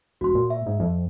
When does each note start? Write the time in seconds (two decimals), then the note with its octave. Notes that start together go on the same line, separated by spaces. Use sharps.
0.21 E1 F#4 C6
0.35 A#2
0.50 E5
0.66 G#2
0.80 F2